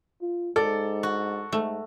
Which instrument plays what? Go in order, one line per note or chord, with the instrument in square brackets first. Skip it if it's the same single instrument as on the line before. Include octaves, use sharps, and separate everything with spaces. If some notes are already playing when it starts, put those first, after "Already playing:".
[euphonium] F4
[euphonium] G#2 [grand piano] A4 [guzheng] D5
[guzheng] F#4
[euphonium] G#2 [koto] A3